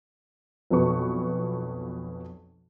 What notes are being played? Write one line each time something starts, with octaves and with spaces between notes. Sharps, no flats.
B1 F2 B2 B4 C#6